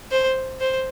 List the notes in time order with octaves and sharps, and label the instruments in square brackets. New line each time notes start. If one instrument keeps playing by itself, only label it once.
[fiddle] C5
C5